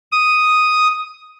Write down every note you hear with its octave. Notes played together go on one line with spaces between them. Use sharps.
D#6